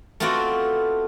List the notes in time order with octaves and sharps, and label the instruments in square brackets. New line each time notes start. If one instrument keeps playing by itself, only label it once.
[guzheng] A3 B3 C4 F4 F#4 D5